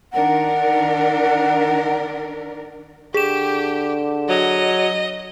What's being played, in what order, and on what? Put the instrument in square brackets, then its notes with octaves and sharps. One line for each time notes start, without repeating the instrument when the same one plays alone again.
[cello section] D#3 D4 A#4 [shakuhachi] F#5
[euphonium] D3 [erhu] G4 [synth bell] G#4 E7
[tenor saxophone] F#3 [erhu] D#5